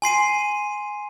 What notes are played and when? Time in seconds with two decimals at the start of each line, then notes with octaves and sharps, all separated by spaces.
0.02 G#5 C6 C7 D#7